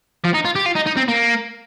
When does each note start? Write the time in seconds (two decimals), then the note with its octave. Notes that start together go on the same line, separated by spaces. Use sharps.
0.24 F3
0.34 D#4
0.45 F4
0.55 G4
0.66 F4
0.76 D#4
0.87 D#4
0.97 C4
1.08 A#3